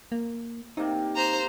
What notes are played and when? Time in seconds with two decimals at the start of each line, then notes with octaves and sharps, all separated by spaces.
0.12 A#3
0.77 C3 A#3 D#4
1.16 C5 A#5